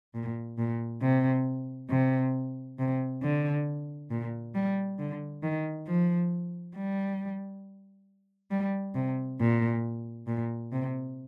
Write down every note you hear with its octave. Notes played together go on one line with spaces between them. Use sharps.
A#2
A#2
C3
C3
C3
D3
A#2
G3
D3
D#3
F3
G3
G3
C3
A#2
A#2
C3